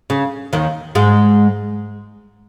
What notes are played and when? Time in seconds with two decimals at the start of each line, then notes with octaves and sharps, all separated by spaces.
0.10 C#3
0.53 D#2 D#3
0.95 G#2 G#3